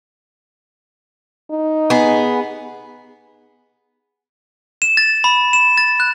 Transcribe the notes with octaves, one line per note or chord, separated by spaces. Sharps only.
D#4
B3 G#4
E7
A6
B5
E7
A6
F#6